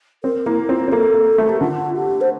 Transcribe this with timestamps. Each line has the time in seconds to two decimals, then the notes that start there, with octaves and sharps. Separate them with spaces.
0.24 C4 A#4
0.46 A#3 E4
0.69 C4 F4
0.88 C4
0.92 A#3 A4
1.14 A#3
1.38 A3
1.49 G4
1.60 D3 F4
1.95 G4
2.21 C5